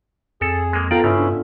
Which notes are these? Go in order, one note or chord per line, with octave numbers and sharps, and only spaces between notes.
F2 G#4 A4
G#3 A#3
B3 F4 A4 D5 F5 G5 A#5
G2 C#3 C#4 E4
D4